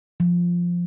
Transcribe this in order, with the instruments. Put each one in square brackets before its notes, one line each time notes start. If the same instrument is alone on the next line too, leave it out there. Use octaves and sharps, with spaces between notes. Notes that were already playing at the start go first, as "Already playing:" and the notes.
[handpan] F3